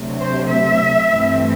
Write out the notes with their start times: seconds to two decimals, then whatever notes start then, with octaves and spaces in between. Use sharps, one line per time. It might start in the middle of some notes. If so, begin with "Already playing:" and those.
Already playing: D2 C3 F#3
0.20 C5
0.49 E5
1.08 G2 E3 A3 C4